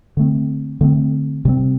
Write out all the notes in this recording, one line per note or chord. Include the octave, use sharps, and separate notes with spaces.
D3 A3 C4
D3 A3 C4
C3 G3 C4